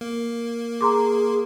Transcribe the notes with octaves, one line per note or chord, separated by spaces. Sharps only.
A#3
G#4 A#5 C6 D6